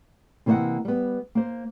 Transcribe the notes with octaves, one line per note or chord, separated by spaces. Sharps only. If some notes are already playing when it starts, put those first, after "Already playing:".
C3 E3 A#3 C5 D#5 F#5
G3 B3
A#3 C5